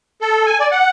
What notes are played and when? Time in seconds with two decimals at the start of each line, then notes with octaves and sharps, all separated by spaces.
0.21 A4
0.46 G#5
0.60 D5
0.72 F#5